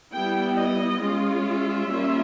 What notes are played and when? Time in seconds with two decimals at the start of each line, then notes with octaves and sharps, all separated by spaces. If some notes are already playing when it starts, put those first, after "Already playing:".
0.12 G3 B3 E4 G5
0.56 D#5
1.02 G#3 C#4 F4
1.44 E5
1.89 G3 A#3 C#4 F4